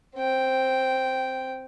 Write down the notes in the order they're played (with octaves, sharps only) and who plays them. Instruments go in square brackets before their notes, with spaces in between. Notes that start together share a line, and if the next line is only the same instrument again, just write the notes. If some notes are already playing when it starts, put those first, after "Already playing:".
[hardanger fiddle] C4 G5